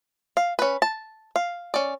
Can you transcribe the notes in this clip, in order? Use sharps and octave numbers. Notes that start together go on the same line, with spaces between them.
F5
C#4 B4
A5
F5
C#4 D5